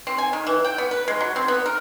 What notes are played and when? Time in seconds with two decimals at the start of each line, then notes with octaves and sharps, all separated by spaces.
0.07 C4
0.18 G#5
0.33 D#3
0.47 E3
0.64 G5
0.78 B3
0.91 B4
1.08 G#3
1.21 F#3
1.36 C4
1.48 B3
1.66 A#4